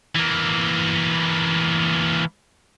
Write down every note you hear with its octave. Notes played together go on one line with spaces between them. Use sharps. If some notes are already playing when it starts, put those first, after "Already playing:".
E3 A#3